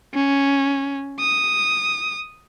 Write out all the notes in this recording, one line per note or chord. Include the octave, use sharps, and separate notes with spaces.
C#4
D#6